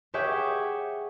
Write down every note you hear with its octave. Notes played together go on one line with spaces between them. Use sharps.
G4 G#4 C#5 E5 F#5 G5